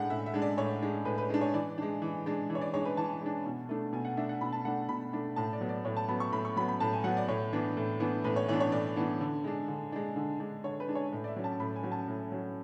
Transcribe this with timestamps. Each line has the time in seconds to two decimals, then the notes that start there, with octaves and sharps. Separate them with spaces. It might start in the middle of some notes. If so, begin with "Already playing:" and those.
Already playing: A2 G#3 D4 F#5
0.10 A2 E5
0.26 E5
0.34 G#3 D4
0.42 D5
0.58 A2 C#5
0.82 G#3 D4
1.05 A2 B4
1.18 B4
1.30 G#3 D4
1.41 C#5
1.54 E3 D5
1.78 G#3 D4
2.02 E3
2.26 G#3 D4
2.50 E3
2.55 C#5
2.61 D5
2.73 G#3 D4 C#5
2.85 B4
2.97 E3 A5
3.22 G#3 D4
3.46 B2
3.69 A3 D4
3.93 B2 G#5
4.05 F#5
4.17 A3 D4 E5
4.29 F#5
4.41 B2 B5
4.53 A5
4.65 A3 D4 F#5
4.89 B2 B5
5.13 A3 D4
5.36 A2 A5
5.53 D5
5.61 F#3 B3
5.69 D5
5.85 A2 C#5
5.97 A5
6.08 F#3 B3 B5
6.20 C#6
6.32 A2 B5
6.45 C#6
6.57 F#3 B5
6.60 B3
6.68 B5
6.80 A2 A5
6.93 G#5
7.04 F#3 B3 F#5
7.17 D5
7.28 A2 C#5
7.53 E3 B3 D4
7.77 A2
8.00 E3 B3 D4
8.24 A2 B4
8.36 C#5
8.48 E3 B3 D4 C#5
8.60 C#5
8.72 A2 D5
8.96 E3 B3 D4
9.21 D3
9.44 G#3 D4
9.68 D3
9.92 G#3 D4
10.16 D3
10.40 G#3 D4
10.64 D3 C#5
10.80 B4
10.88 G#3 D4
10.95 C#5
11.12 A2
11.24 D5
11.28 E5
11.36 F#3 C#4
11.44 A5
11.60 A2 B5
11.76 G#5
11.83 F#3 C#4
11.92 A5
12.08 A2
12.32 F#3 C#4